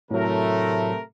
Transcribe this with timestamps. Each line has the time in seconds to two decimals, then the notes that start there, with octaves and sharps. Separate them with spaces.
0.11 A2 C3 F#3 A3 A#4